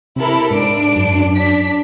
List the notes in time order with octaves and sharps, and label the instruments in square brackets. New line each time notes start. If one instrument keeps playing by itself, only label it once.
[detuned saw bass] C3 [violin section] E4 A4 A#4
[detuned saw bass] G#2 [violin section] D4 D7
[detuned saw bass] F#2
[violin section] D4 B6